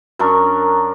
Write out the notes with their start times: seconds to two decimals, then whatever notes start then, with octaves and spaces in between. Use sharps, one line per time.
0.19 F#2 D4 A#4 C#6